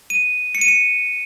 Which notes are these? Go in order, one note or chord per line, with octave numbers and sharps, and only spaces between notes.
D#7
C#7
D#7
C#7